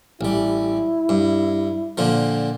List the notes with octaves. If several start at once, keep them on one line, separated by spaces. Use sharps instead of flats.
A1 G3 E4
G2
A#2 D3 F3